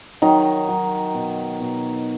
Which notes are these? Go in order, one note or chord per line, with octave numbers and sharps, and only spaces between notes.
D#3 F#3 D#4
F#3
B2
B2